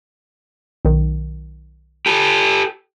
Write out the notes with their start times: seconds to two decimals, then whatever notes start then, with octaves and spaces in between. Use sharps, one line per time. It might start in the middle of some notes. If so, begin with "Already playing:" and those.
0.85 B1 D#3
2.06 G4 A4